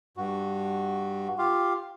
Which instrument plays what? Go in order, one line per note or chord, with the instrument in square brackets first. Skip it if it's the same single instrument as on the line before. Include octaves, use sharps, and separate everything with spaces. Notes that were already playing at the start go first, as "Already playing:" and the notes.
[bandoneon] G2 F#4
F4 G4 F5